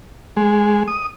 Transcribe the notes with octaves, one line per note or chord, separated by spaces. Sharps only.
G#3
D#6